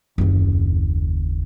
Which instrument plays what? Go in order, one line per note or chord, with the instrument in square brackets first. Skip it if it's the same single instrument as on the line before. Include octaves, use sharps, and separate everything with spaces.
[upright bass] F#1 D#2